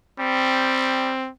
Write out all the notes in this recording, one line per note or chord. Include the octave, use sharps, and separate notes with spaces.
G3 C4